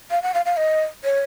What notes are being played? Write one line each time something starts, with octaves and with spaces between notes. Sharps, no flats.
F5
F#5
F5
F5
D#5
C#5